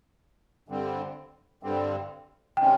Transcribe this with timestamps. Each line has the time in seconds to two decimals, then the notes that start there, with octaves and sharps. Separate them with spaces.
0.68 G2 D3 G3 C4
1.63 G2 D3 G3 C4
2.57 C3 D#3 G#3 C#4 G5